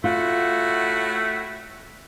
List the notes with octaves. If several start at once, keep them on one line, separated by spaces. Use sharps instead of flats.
A2 A3 F4 F#4 F#5